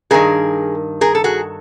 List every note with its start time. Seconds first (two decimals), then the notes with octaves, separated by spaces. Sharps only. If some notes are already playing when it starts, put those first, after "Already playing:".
0.11 G2 D#3 G#4 A#4
1.01 G#4 A#4
1.15 A4
1.24 F#4 G#4